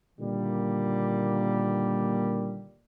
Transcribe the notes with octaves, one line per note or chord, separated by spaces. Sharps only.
A#2 D3 D#3 G3 A#3